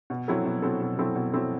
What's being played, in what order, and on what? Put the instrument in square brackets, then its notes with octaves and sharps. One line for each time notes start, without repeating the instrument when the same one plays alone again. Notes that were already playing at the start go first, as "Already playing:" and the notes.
[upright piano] B2
F#3 C4 E4 A4
B2
F#3 C4 E4 A4
B2
F#3 C4 E4 A4
B2
F#3 C4 E4 A4